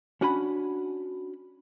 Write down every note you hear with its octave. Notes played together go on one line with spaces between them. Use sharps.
C#4 D4 F#4 F#5 G#5 B5